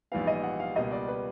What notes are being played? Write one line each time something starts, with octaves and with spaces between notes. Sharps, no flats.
A#1 G#2 E3 G3 B3 F5
D#5
F#5
F5
C#2 B2 G3 A#3 D#5
D5
B4